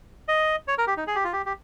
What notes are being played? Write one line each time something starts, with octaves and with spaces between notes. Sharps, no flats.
D#5
C#5
A#4
G4
D#4
G#4
G4
F4
G4
G4